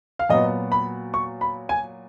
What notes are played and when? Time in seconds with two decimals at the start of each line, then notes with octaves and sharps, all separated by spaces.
0.19 F5
0.29 A#2 F#3 B3 D#5
0.72 B5
1.14 C#6
1.41 B5
1.69 G#5